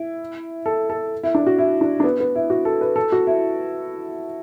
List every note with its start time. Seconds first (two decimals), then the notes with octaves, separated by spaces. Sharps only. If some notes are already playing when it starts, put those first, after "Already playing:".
Already playing: E4
0.66 A4
0.90 A4
1.23 E4
1.35 D4
1.47 F#4
1.58 E4
1.81 D4
2.00 D4
2.04 B3
2.20 B3
2.36 E4
2.50 F#4
2.65 A4
2.81 B4
2.96 A4
3.12 F#4
3.27 E4